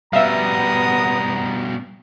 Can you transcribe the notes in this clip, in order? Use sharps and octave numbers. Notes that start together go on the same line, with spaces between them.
B2 G3 B3 E5 F5 A#5 D#6